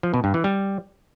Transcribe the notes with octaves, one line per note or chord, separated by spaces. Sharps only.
F3
B2
G2
E3
G3